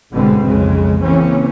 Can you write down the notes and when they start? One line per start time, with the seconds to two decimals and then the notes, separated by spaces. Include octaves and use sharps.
0.13 G1 G#2 B2 D3 G#3 C4
0.46 B1 F2 C#3 G#3
1.03 C#3 E3 A#3 C4 C#4